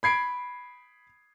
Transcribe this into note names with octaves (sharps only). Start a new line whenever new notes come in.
B5 G#6 C7 D7